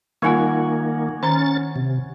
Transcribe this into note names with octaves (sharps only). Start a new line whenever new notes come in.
D#3 G3 A#3 D#4 F4 C#5 F#5 G#5
D#3 C#4 A#5 A6
C3